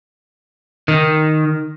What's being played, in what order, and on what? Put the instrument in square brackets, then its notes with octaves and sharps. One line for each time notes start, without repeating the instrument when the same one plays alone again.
[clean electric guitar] D#3